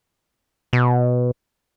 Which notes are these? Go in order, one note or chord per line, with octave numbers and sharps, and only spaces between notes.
B2